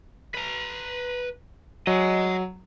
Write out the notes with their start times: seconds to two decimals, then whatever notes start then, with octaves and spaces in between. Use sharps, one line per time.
0.34 B4 A#5
1.87 F#3 D#5 G#5